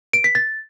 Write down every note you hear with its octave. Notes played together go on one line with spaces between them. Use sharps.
D7
B6
A6